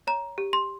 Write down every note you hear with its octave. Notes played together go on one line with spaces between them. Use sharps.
C#5 A#5
G4
C6